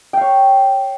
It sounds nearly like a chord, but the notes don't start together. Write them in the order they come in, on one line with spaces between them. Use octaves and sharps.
G5 F5 C#5